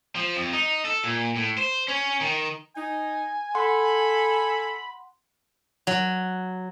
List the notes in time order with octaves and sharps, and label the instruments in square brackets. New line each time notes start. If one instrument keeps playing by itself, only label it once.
[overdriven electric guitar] F3
F2
D#4
A4
A#2
A2
C5
C#4
D#3
[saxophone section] D#4 [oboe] G#5
[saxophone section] A4 [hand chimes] F#5 C6 [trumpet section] B5
[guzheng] F#3